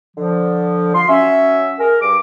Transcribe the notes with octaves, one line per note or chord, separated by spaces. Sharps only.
D3 F3
F4 C6
F#3 C#4 E5
G#4 A#4
G2 D6